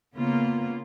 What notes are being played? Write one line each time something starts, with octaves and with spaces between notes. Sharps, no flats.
C#3 A#3 B3 F4